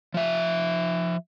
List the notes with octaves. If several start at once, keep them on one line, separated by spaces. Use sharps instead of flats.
F3 E5